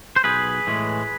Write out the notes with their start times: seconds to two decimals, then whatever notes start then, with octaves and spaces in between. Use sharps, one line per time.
0.16 C5
0.24 B1 G#4 B4
0.67 A2 E3 G#3